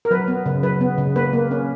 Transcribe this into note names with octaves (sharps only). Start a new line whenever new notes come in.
A#4
F#3 B4
B3
C#3
F#3 B4
B3
C#3
A#3 B4
A#3
C#4